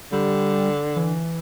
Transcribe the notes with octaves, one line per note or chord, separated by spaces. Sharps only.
D3 G3
E3